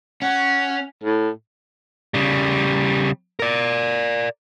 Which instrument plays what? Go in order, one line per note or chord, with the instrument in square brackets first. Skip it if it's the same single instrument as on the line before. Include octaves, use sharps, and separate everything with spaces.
[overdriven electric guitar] C#4 [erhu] F#5
[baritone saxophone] A2
[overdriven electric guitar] C#3 G3
A#4 D5